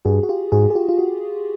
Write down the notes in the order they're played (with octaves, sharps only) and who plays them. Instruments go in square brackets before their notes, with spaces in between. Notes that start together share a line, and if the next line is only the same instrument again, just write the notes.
[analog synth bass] G2 [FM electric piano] F#4 G#4
[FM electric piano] F#4
F4 G4
[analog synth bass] G#2 [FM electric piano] F#4 G#4
[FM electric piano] G#4
F4 G4
F4
F#4